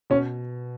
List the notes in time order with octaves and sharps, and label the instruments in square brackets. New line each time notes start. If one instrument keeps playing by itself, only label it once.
[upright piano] B2 [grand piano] C#4